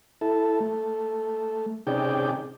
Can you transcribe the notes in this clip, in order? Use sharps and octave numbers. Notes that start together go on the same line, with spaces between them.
E4 A4
A3
C3 C#4 D#4 G#4 D5 G5